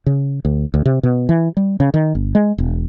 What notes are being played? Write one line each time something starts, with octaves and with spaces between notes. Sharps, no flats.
C#3
D2
D2
C3
B2
E3
G3
C#3
D#3
G1
G#3
E1